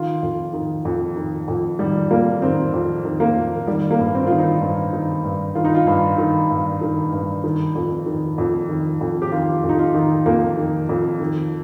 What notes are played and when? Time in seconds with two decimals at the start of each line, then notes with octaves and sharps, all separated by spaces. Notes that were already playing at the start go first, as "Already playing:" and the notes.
Already playing: D#3 F4
0.23 F2
0.53 D#3
0.85 F2
1.16 D#3
1.48 F2
1.79 D#3 G3
2.11 F2 A#3
2.42 D#3 C4
2.73 F2
3.05 D#3
3.20 A#3
3.36 F2
3.67 D#3 G3
3.91 A#3
3.99 G2
4.15 C4
4.27 D#3 F4
4.38 D#4
4.61 G2
4.93 D#3
5.24 G2
5.55 D#3 F4
5.65 D#4
5.75 F4
5.87 G2
6.18 D#3
6.50 G2
6.81 D#3
7.12 G2
7.44 D#3
7.75 F2
8.06 D#3
8.38 F2
8.69 D#3
9.01 F2
9.22 G4
9.32 D#3 F4
9.63 F2
9.69 D#4
9.79 F4
9.94 D#3
10.26 F2 A#3
10.57 D#3
10.89 F2
11.20 D#3